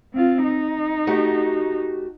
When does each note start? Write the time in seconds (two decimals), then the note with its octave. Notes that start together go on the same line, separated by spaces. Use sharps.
0.13 C4 F4
0.44 D#4
1.07 A3 F#4 G4